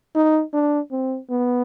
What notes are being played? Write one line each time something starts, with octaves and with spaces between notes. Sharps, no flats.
D#4
D4
C4
B3